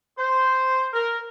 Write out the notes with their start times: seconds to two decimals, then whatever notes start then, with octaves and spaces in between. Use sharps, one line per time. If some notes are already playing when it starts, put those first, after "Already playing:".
0.17 C5
0.93 A#4